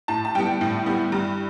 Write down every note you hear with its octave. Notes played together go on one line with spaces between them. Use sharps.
A2 A5
A5
G3 B3 G5
A2
G3 B3
G2